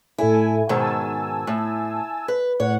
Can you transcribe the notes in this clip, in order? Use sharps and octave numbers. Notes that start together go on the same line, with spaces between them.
A2 E4 A4 G#5
G#2 B2 D#3 G#5 A5 E6
A2
B4
A2 C#5 F#5